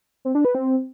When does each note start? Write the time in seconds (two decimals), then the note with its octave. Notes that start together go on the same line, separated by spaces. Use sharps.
0.25 C4
0.35 D4
0.45 B4
0.55 C4